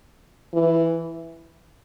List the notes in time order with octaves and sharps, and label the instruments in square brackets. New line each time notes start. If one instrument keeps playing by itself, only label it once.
[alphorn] E3